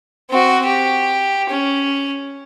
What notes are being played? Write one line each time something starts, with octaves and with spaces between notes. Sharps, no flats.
C4 F#4
G4
C#4